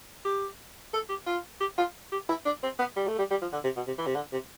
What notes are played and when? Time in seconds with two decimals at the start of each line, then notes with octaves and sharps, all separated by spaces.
0.25 G4
0.93 A4
1.09 G4
1.26 F4
1.61 G4
1.78 F4
2.12 G4
2.29 E4
2.45 D4
2.63 C4
2.79 B3
2.96 G3
3.08 A3
3.18 G3
3.31 G3
3.42 F3
3.52 D3
3.64 C3
3.76 B2
3.87 C3
3.98 E3
4.07 C3
4.15 D3
4.32 C3